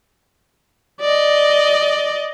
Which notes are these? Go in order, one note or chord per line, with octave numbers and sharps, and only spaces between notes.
D5 D#5